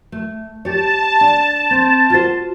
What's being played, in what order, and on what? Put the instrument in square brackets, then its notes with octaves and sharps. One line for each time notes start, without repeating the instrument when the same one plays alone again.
[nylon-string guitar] A3
[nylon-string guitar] G4 C#5 [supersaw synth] A5
[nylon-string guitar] D4
C4
F4 F#4 C5